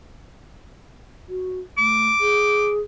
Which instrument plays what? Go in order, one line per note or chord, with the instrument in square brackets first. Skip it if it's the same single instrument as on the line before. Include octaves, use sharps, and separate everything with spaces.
[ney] F#4
[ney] A3 [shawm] D6
[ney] G#4